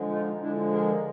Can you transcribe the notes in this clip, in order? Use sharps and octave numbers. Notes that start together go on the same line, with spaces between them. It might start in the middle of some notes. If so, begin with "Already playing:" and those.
Already playing: D3 F3 G#3
D#4 F4
D3 F3 G#3 D4 E4
G#4 A#4